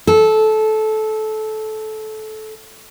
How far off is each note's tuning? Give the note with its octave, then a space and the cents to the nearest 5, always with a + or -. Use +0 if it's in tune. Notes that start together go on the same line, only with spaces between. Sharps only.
A4 -20